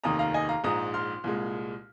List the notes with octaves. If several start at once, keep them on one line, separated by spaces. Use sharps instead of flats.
F1 D#2 D#3 A#5 D#6
F5 A#5
D#5 G#5
F5 A#5
A#1 G#2 G#3 A#5 D#6
C6 F6
C2 A#2 G#3